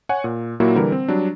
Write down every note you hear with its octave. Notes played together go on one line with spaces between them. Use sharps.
C#5 F#5 G#5
A#2
A#2 F#3 A#3 E4 F#4
D3 E3 G3 A#4
C4
F#3 G3 D4